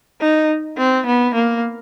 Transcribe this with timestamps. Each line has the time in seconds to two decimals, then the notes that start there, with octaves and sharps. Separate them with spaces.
0.21 D#4
0.77 C4
1.06 B3
1.34 A#3